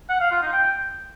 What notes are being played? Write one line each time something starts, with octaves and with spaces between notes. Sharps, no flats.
F#5
F5
F4
D#4
G5